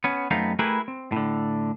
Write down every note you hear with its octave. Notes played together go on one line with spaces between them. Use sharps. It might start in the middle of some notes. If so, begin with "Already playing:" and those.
B3 C#4
F#2 A3 B3 C4 D#4 F5
A3 E4 G4 G#4 A#4 B4
C4
A2 D3